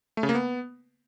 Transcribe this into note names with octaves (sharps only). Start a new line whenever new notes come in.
A3
C#3
A#3
B3